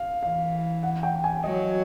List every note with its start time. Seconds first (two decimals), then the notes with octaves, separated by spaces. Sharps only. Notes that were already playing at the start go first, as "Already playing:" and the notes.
Already playing: F5
0.22 E3 F5
0.83 F#5
1.03 G5
1.24 G#5
1.44 F#3 D#5